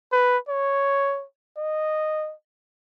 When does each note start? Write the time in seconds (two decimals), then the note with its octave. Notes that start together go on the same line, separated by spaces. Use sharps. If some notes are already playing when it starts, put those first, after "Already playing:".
0.12 B4
0.49 C#5
1.57 D#5